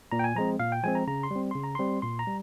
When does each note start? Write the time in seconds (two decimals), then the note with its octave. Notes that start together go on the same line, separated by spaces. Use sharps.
0.12 A#2 A#5
0.19 G5
0.24 G#5
0.35 F3 G#3 C4 A#5
0.60 A#2 F5
0.72 G5
0.83 F3 G#3 C4 G#5
0.95 A#5
1.07 C#3 A#5
1.23 C6
1.31 G3 C4
1.51 C#3 C6
1.64 A#5
1.75 G3 C4 C6
2.02 A#2 C6
2.19 A#5
2.27 G3